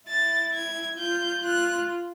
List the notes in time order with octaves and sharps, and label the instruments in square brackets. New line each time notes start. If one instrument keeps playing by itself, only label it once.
[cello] E4 [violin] A6
[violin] G#6
[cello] F4 [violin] G6
[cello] F4 [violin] F#6